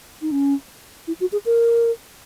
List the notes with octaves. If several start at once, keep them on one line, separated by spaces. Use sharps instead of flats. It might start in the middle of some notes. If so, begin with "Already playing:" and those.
D#4
C#4
E4
F#4
G#4
A#4